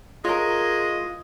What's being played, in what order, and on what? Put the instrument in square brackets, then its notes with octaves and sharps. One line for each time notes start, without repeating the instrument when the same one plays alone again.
[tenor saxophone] G#3 [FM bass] F4 [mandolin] A#4 C#5 [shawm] D#5